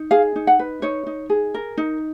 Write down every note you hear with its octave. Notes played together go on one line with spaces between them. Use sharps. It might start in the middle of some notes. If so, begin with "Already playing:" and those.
Already playing: D#4
G#4 F5
D#4
F#5
B4
D#4 C#5
D#4
G#4
A#4
D#4